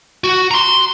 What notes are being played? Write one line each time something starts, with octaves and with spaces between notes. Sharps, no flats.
F#4
A#5 C6